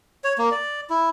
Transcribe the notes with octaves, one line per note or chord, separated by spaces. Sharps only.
C#5
A#3
D5
E4